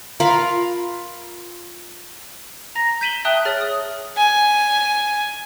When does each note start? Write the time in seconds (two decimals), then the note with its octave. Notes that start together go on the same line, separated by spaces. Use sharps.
0.20 F4 A#4 F5 B5
2.75 A#5 A#6
3.01 G6 B6 D#7 E7 F#7 G7
3.25 E5 G5 A5 D#6 F#6 G7
3.45 G#4 C#5 F6 A6
3.61 D#6
4.17 G#5